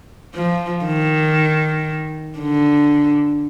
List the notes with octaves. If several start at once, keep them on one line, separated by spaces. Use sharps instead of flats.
F3
D#3
D3